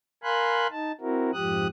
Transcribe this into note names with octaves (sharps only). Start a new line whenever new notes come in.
A#4 F5 G#5 B5 C6 F#6
D#4 A5
C4 E4 F#4 A#4
F2 G#2 F3 G4 D#6 F#6